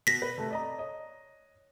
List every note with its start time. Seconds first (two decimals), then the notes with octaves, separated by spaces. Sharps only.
0.07 B2 A#6 B6
0.22 B4
0.38 C3 A3 A4
0.51 D5 D#5 A#5
0.78 C#5 D#5